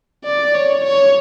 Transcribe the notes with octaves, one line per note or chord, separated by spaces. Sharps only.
D5
C#5
C#5